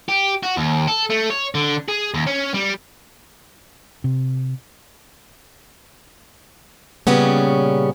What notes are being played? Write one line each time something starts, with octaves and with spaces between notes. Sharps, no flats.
G4
F#4
D#2
A4
A3
C#5
D3
G#4
D#2
C#4
G3
C3
A#2 C#3 G3 B3 C#4